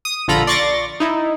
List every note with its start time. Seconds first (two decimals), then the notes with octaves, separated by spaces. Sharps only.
0.05 D#6
0.28 A#1 D3 F4 A4 A#5 B5
0.47 D5 C6 C#6 A6 A#6
1.00 D#4 E4